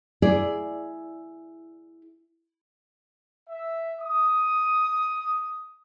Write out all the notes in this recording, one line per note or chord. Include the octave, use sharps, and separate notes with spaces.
E4 G#4 D5
E5
D#6